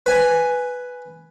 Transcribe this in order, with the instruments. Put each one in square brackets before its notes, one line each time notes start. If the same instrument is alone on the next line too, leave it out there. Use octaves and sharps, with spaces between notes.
[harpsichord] B4 G#5